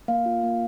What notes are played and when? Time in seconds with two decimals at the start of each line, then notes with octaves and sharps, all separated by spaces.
0.08 A#3 F5
0.26 F4
0.43 A#3